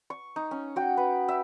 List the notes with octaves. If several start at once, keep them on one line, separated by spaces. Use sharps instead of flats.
C#6
D#4
C#4
F#4 G5
B4
E5